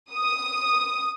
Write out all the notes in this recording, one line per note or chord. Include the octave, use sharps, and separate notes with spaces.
D#6